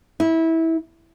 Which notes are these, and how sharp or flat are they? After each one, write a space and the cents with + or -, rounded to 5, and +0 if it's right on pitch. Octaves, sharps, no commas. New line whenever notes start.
E4 -20